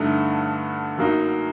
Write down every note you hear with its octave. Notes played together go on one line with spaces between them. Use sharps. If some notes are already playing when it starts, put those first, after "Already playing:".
Already playing: G2 D3 A3 D#4
F#2 F#3 A#3 D#4